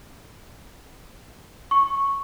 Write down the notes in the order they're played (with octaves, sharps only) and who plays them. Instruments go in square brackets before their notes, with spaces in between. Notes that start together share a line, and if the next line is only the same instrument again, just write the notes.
[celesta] C#6